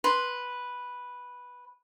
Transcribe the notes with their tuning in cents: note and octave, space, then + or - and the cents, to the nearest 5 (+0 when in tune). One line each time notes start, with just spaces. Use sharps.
B4 -5 C6 -5